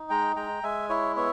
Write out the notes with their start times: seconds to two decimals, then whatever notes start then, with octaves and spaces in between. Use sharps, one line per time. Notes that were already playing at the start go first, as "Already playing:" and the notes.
Already playing: D#4
0.10 G#3 G5 A#5
0.36 G#3 G5 A#5
0.64 G#3 E5 G#5
0.89 E4 C#5 E5
1.16 B3 C#5 E5